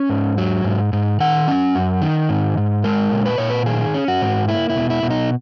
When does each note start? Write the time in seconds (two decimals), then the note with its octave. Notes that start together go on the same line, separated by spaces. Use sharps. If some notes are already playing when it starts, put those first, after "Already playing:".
Already playing: C#4 G#5
0.10 G#2
0.38 F#3
0.64 G#2
0.93 G#2
1.20 D#3 F#5
1.48 C#4
1.75 F#2
2.02 D#3
2.29 G#2
2.57 G#2
2.84 G#3 A#4
3.12 A#2
3.26 B4
3.38 A#2 C#5
3.50 B4
3.66 D#3 G#4
3.94 C#4
4.08 F#4
4.22 G#2
4.48 A#3 E4
4.70 E4
4.76 B2
4.90 E4
5.03 B2
5.10 D#4